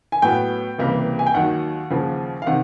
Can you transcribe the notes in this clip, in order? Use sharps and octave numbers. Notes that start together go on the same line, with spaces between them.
G#5
A2 F#3 B3 G5
C#2 C3 E3 G3 A#3
G#5
G5
D#2 D#3 F#3 F#5
D#2 C#3 F3
F5
C3 D#3 F#5